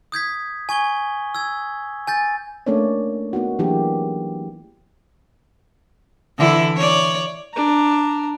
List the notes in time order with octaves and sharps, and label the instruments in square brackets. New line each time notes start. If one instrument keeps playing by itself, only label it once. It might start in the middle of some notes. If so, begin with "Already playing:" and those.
[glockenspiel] D#6 G6 G#6 B6
G#5 C#6 G#6 G7
E6 G#6
G#5 G6 A6
[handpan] A3 A#3 C#4 D4 C#5 D5
A#3 B3 D#4 F#4
E3 F#3 A#3 D4 G4 G#4
[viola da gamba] D3 E3 E4
C#5 D5
[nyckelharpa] D4 A#5